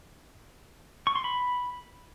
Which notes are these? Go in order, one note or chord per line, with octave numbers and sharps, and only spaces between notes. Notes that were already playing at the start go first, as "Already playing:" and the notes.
C#6
C6
B5